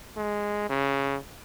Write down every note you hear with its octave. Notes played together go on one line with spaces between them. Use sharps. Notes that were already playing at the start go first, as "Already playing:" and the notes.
G#3
C#3